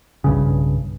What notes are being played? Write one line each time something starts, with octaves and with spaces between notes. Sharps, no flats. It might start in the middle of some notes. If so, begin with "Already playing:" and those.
B1 G2 C#3